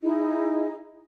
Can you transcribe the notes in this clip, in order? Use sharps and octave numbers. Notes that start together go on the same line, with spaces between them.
D#4 E4 G#4 D#5